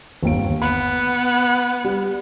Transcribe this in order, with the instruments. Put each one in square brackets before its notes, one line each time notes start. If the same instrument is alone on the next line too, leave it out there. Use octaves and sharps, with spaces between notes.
[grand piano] G1 D#2 D7
[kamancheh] B3 [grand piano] B5
[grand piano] G3